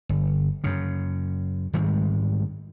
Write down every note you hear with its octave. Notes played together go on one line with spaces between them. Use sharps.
G1
F#2 C#3
G#2 D#3 G3 G#3